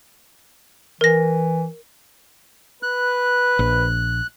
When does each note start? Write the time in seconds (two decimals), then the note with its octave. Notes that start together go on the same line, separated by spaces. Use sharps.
1.01 E3 A#4 A#6
2.83 B4 F#6
3.59 A#1